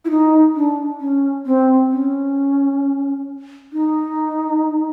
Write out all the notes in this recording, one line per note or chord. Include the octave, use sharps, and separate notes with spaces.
E4
D#4
D4
C#4
C4
C#4
D#4